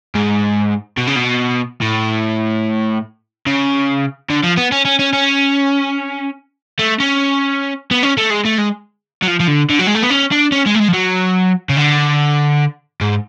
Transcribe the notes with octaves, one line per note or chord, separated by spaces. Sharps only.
G#2
B2
C#3
B2
A2
C#3
D3
F3
B3
C#4
C#4
C#4
C#4
A3
C#4
B3
C#4
A3
G#3
A3
G#3
F#3
F3
F3
D3
D3
F#3
G#3
A3
B3
C#4
D4
C#4
G#3
A3
G#3
F3
F#3
C#3
D3
G#2